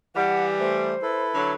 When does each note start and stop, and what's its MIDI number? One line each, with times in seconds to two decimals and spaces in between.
0.16 0.96 52
0.16 0.96 55
0.16 0.45 78
0.59 0.95 57
0.59 1.23 72
1.02 1.53 64
1.02 1.53 69
1.02 1.53 71
1.35 1.55 50
1.35 1.55 54
1.35 1.53 83